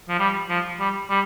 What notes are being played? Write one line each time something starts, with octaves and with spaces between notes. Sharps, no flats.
F3
G3
F3
G3
G3